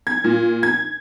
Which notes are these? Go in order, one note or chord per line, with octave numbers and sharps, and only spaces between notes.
G#6
A#2
G#6